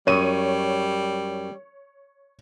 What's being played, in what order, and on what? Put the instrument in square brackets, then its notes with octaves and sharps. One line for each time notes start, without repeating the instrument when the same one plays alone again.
[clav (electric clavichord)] F#2 [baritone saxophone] G3 [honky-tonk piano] C#5 D#7